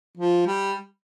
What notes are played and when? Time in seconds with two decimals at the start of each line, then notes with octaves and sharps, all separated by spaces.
0.17 F3
0.47 G3